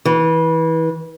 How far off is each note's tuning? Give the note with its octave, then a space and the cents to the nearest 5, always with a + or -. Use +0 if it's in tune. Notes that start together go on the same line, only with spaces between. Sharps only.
E3 -25